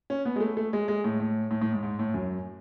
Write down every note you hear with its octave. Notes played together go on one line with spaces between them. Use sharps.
C#4
B3
G#3
A3
A3
G#3
G#3
A2
A2
A2
A2
G#2
G#2
A2
F#2